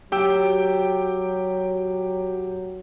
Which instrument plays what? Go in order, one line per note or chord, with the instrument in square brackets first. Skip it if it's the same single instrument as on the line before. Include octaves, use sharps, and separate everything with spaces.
[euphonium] F#3 [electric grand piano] G4 G5 E6